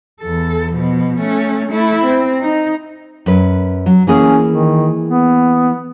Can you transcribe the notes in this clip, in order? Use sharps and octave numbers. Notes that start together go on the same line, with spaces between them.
E2 A4
B2 F3
A3 C#4
A3 E4
C4
D#4
F#2 B4
F#3
E3 A#3 C#4 G#4
D#3
B3